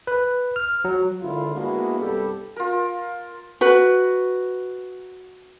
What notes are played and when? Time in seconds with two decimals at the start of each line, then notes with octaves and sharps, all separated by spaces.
0.07 B4
0.56 F6
0.85 F#3
1.21 G#1 D3 E4 F4
1.55 G#3 A#3 B3 D4 E4 F#4
2.00 C2 G2 G3 B3 G4 A4
2.56 F4 A#4
3.61 F#4 B4